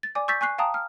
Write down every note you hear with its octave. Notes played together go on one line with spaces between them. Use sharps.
A6
D5 G#5 D6
C#6 E6 G6 A6 B6
G#5 C#6 F#6 C7
F5 G5 A5 A#5 D#6
F6